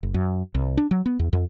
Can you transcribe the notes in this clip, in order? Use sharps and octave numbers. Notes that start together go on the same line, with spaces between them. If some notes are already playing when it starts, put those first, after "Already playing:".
F#1
F#2
C2
D4
F#3
B3
E2
F2